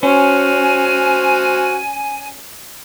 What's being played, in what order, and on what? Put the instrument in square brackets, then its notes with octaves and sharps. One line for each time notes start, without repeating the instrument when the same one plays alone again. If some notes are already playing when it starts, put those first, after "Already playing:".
[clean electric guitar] C#4 [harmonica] F#4 C5 F6 [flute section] G#5